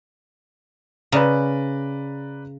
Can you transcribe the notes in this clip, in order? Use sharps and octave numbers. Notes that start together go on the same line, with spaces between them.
C#3 B4 D5 A#5